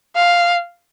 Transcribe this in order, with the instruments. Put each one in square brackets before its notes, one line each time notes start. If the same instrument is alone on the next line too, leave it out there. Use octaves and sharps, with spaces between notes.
[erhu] F5